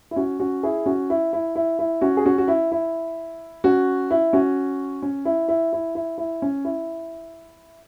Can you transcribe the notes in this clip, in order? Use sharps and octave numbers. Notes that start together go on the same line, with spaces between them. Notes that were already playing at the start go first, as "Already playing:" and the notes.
E4
C#4 F#4
C#4 F#4
E4 G#4
C#4 F#4
E4
E4
E4
E4
C#4 F#4
G#4
C#4 F#4
F#4
E4
E4
C#4 F#4
E4
C#4 F#4
C#4
E4
E4
E4
E4
E4
C#4
E4